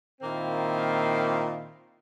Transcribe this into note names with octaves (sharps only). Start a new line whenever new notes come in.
A#2 D#3 A#3 C4 E4 F4